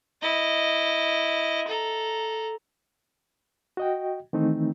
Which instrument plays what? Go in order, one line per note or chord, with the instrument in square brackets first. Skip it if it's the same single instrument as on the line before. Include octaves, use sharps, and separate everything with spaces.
[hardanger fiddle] E4 D#5
A4 A#5
[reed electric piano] F#4 D#5 G5
D#3 E3 A3 C4 D#4